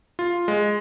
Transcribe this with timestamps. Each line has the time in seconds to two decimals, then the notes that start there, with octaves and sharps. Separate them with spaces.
0.19 F4
0.48 G#3